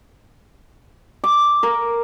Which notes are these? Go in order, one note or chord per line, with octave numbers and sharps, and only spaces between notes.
D6
A#4